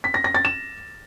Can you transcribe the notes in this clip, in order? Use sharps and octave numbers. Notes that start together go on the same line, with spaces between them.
B6
A#6
A#6
A6
E7